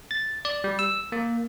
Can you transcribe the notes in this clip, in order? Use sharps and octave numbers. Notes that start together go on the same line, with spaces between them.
A6
D5
G3
E6
A#3